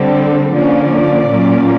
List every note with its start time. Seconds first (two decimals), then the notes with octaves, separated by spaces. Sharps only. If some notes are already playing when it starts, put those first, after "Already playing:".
Already playing: D3 G3 C4 A4
0.51 D3 F3 A#3 C#4 D5
1.29 A#2 F#3 A#3 C#4